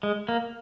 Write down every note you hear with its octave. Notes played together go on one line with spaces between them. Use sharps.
G#3
A#3